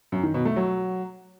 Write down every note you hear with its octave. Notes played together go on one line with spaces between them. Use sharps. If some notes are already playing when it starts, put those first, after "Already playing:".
F#2
D#3
B2
A3
F#3